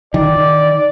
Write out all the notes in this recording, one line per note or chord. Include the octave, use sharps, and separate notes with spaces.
D#3 D5